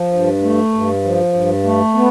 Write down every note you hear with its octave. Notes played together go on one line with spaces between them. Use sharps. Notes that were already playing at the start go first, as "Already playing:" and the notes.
Already playing: F3
G2
A3
G2
F3
G2
A3
B3